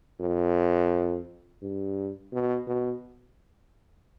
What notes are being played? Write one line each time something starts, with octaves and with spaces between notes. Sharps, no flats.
F2
G2
B2
B2